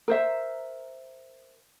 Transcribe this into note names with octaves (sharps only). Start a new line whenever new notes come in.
A#4 C5 E5